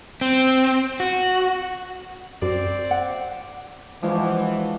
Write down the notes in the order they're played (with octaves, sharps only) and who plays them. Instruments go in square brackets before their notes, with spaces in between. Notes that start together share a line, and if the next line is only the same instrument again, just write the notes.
[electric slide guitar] C4
F#4
[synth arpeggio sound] F#2 [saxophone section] C4 D5
[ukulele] F#5
[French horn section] E3 [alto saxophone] F3 [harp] G#3 [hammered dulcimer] D4 F#4